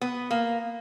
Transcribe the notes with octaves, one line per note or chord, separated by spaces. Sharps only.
B3
A#3